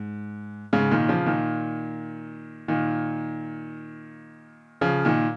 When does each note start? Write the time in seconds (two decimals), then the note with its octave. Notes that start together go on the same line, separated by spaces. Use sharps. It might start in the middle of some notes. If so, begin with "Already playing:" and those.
Already playing: G#2
0.73 G#2 C#3
0.91 A#2 D#3
1.09 C#3 F3
1.26 A#2 D#3
2.68 A#2 D#3
4.81 C#3 F3
5.05 A#2 D#3